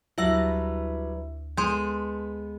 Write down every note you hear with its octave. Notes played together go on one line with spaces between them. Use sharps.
D2 F#3 G3 E4 B4 E5 E6 A#6
G#3 B3 A4 C6 G6